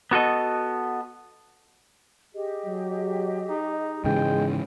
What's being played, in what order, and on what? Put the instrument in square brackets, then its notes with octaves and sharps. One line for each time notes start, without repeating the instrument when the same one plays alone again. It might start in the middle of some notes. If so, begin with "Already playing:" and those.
[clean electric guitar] B3 F#4 A4 D#5
[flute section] G4 G#4 D#5
[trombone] F#3
[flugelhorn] D#4
[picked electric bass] G#2 C#3 E3 [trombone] G#3 [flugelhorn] G5